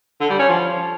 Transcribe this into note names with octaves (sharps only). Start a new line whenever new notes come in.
D3
G3
C#4
F3